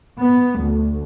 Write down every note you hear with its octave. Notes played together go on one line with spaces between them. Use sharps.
B3
D2